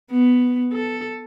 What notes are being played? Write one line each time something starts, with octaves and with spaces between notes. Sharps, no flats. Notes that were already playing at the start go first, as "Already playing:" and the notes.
B3
A4